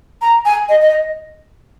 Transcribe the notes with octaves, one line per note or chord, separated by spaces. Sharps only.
A#5
G#5
D#5
D#5